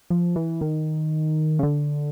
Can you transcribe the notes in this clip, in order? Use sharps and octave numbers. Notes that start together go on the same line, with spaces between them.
F3
E3
D#3
C#3
D3